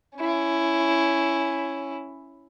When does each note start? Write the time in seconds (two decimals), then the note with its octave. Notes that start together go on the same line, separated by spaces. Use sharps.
0.17 C#4 E4